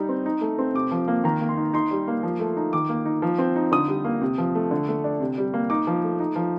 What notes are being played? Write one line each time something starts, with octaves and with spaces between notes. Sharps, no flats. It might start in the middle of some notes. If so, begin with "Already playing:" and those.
Already playing: G3 D#4
C4
D#4
A3
C4
C3 D6
F3
A#3
D#3 A#5
A#3
C6
D#4
D#4 C6
G3
A#3
F3
A3
D#4
D#3 D6
A#3
D#4
F3
C4
D#4
D3 D#6
G3
A#3
C3
F3
A3
D3
A3
D4
C3
G3
A#3
D#4 D6
F3
A3
D#4
F3